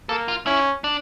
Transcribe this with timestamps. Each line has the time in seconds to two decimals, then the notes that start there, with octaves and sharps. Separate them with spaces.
0.09 A#3 A4
0.28 F4
0.46 C#4 E4
0.84 D4